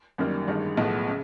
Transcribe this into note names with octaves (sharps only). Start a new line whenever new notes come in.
G1 F#2 D#3 G3 A#3
A1 G2 D#3 G#3
B1 A2 F3 G#3 B3
C#3